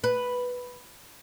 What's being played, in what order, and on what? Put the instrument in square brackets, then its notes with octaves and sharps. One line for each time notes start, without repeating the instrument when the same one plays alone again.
[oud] B4